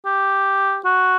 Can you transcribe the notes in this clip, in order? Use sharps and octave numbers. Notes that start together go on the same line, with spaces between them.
G4
F#4